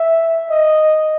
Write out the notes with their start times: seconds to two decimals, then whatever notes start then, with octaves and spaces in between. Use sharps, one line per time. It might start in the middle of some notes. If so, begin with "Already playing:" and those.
Already playing: E5
0.50 D#5